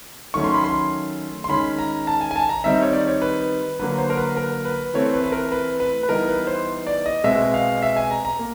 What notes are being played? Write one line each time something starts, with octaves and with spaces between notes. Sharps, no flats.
D#3 F#3 A3 C#4 C#6
C6
B5
C6
C6
D#3 G#3 C#4 B5
A#5
A5
G#5
G#5
A5
A#5
D#3 G3 C4 D#4 E5
C#5
D5
C#5
B4
D3 F#3 A#3 B4
C5
A#4
B4
A#4
B4
E3 A3 C4 C#5
B4
B4
A#4
B4
B4
B4
E3 G3 B3 D#4 A#4
B4
C5
D5
D#5
B2 G#3 C4 E5
F5
E5
G#5
A#5
A#5
A#3